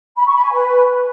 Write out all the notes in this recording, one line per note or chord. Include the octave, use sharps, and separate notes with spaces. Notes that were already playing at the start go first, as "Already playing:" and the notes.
B5
C#6
B5
G#5
B4